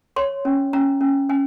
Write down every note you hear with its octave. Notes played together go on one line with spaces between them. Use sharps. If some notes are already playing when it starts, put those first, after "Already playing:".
C#5 C6
C#4
C#4 A#5
C#4
C#4 G#5